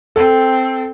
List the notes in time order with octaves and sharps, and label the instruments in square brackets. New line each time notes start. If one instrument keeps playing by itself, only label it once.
[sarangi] C4 [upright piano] A4